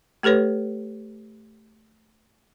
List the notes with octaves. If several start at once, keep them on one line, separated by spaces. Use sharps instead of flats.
A3 G4 A4 B4 C#5